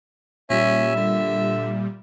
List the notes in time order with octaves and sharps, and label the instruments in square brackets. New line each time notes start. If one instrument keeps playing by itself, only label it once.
[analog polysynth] A#2 G3 [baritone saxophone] C#4 [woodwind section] E5
[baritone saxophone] D3